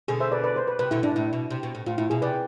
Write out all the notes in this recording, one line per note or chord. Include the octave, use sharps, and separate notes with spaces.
B2 D3 G#4
C5 E5
B4 D5
B4 D5
C5
B4
C3 B4
B2 D3 E4
G#2 D4
A2 E4
B2
C3
B2
A2
A2 F4
A2 E4
B2 G#4
C3 B4 D5